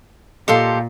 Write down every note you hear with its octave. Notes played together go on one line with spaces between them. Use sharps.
A#2 G4 A4 D#5 F5 C6